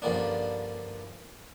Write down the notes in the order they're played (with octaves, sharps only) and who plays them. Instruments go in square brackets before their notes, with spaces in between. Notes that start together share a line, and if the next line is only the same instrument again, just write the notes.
[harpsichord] G2 D3 F3 A#3 C#4 D4